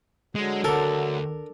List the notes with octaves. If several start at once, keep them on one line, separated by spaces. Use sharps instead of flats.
D3 F#3 G#3
D2 D4 A4 A#4